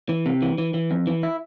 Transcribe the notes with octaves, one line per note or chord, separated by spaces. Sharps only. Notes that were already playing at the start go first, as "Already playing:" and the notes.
E3
C3
E3
E3
E3
F2
E3
E4